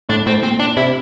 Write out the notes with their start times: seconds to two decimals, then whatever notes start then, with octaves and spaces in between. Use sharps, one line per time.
0.09 A2 D4
0.26 A2 C4
0.43 A#2 C4
0.60 D4
0.77 C3 E4